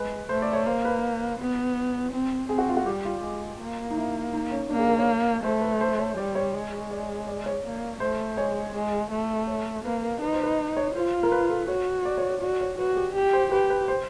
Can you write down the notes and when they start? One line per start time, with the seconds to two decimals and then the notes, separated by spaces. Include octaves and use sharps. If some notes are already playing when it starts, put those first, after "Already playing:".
Already playing: G#3 B4
0.29 A3 C5
0.42 D5
0.53 C#5
0.66 A#3 C5
0.85 B4
1.39 B3
2.12 C4
2.49 C4 G#4
2.58 F#4
2.69 F4
2.77 F#4
2.86 G3 G4
3.05 F4
3.24 G#3
3.60 A#3
3.90 D#4
3.97 E4
4.33 D#4
4.51 C#4
4.70 A#3 D4
4.79 G#4
4.89 A#4
4.98 C#5
5.44 A3 C5
5.61 B4
5.81 C5
5.99 C#5
6.17 G3 D5
6.35 C#5
6.54 G#3
6.91 D5
7.27 D5
7.46 C#5
7.64 A#3
8.00 A3 C5
8.37 G#3 C#5
8.75 G#3
9.11 A3
9.47 C#5
9.84 A#3 B4
10.02 A#4
10.21 D#4 B4
10.33 C5
10.43 B4
10.77 C#5
10.95 F4 C5
11.23 A#4
11.32 B4
11.50 A4
11.68 F#4 C#5
12.05 D5
12.18 C#5
12.30 C#5
12.42 F#4 D5
12.60 C#5
12.78 F#4 B4
12.96 G4
13.15 G4
13.33 C5
13.51 G4 B4
13.70 B4
13.88 C5